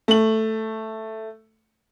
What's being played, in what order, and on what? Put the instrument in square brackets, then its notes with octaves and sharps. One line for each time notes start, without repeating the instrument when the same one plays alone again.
[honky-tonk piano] A3 F#7